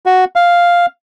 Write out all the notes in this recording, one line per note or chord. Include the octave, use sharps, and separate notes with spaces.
F#4
F5